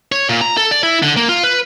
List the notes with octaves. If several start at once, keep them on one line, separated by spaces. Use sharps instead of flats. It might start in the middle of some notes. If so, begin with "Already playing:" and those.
C#5
A#2
A#5
A4
D5
E4
D3
A#3
F4
B4